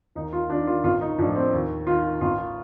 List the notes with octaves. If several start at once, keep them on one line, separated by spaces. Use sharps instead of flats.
D#2 D#4
F4
D#3 D4
F4
A1 F4
D#4
A2 F3 D4
C4
D#2
D#3 F4
A1 F4